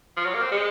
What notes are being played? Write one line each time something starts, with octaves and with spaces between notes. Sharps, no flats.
F3
F#3
A#3
C4
G#3